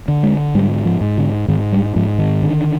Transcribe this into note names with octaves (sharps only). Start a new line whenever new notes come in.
D3
G#3
G#2 G3
F3
G#2
D3
G#2 D#3
G3
G#2 F3
D#3
D3